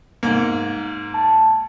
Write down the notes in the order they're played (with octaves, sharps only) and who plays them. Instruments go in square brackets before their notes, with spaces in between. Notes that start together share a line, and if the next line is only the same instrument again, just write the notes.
[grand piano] G#2 A#3
[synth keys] A5